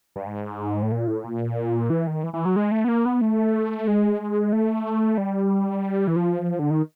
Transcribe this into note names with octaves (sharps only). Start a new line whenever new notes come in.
G2
G#2
A2
A#2
A2
A#2
E3
D#3
E3
E3
F#3
G#3
A3
B3
A#3
B3
A3
G#3
A3
G3
E3
F3
D3
D#3